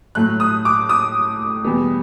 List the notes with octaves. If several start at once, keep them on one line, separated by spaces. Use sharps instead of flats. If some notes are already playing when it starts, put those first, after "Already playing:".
A2 F#3 A3 F#6
D#6
D6
D#6
E2 B2 G3 B3